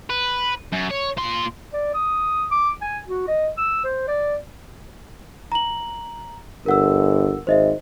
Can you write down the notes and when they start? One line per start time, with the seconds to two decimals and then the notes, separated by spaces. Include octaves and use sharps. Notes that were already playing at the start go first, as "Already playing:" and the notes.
0.10 B4
0.72 F#2
0.90 C#5
1.17 A#2 C6
1.73 D5
1.94 D#6
2.51 D6
2.81 G#5
3.07 F#4
3.28 D#5
3.57 E6
3.84 C5
4.07 D5
5.52 A#5 F#7
6.66 G1 A#4 F#5 E6
7.47 G#1 C5 D#5 E5